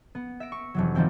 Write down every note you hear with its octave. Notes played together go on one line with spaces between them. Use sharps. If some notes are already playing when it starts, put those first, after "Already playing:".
B3
E5 A#6 D7
C#6
F1 E3 F#3
D#3 F3 G3 C4 E4